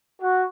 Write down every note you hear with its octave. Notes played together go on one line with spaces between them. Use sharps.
F#4